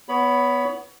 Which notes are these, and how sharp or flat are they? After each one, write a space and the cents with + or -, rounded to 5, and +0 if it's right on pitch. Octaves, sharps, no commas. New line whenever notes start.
B3 +0 C#5 +30 B5 +0